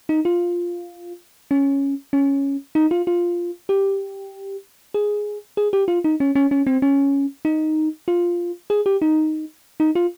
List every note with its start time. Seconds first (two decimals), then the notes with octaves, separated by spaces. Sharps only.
0.09 D#4
0.25 F4
1.51 C#4
2.13 C#4
2.75 D#4
2.91 F4
3.07 F4
3.69 G4
4.94 G#4
5.57 G#4
5.73 G4
5.88 F4
6.04 D#4
6.20 C#4
6.35 C#4
6.51 C#4
6.67 C4
6.82 C#4
7.45 D#4
8.08 F4
8.70 G#4
8.86 G4
9.02 D#4
9.80 D#4
9.95 F4